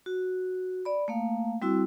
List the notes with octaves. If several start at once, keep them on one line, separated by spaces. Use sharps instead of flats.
F#4
D5 B5
A3 A#3 F5
G3 C4 E4 F#4 E6